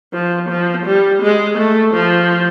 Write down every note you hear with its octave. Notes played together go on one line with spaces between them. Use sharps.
F3
F3
G3
G#3
A3
F3